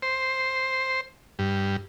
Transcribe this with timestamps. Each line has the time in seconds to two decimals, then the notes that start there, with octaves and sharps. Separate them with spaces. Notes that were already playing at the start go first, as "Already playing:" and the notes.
0.02 C5
1.39 G2